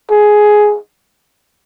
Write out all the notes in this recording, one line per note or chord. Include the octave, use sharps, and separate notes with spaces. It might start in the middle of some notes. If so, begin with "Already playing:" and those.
G#4